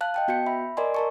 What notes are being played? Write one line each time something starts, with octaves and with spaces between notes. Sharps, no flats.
F5 A5 F#6
D#5 G5 A5
B3 F#4 G6 C#7
E5 B5
A#4 D5 D#5 G#5 C6
A#4 A5 C#6